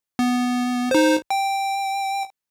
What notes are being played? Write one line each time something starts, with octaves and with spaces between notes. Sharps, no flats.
B3
D#4 C5
G5